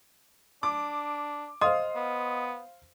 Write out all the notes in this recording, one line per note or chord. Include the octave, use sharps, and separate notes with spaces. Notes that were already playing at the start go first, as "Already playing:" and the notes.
D4 D6
C5 D#5 F5 C6 D#6
B3